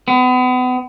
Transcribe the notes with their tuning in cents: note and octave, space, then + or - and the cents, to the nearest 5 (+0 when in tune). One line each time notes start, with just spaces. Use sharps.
B3 +35